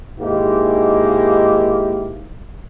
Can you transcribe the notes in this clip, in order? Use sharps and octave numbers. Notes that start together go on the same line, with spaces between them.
G#2 D#3 G#3 A#3 E4 G4